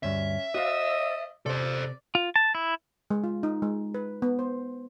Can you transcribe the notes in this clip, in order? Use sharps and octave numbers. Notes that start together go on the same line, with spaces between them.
D2 G2 C#4 E5
F#4 D#5 F5
C3 A4 C5 D5
F4
A5
E4
G#3
F4
D#4
G#3
B4
B3
C5